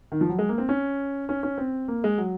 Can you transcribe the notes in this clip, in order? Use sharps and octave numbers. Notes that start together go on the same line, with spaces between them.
D#3
F3
F#3
G#3
A#3
C4
C#4
C#4
C#4
C4
A#3
G#3
F#3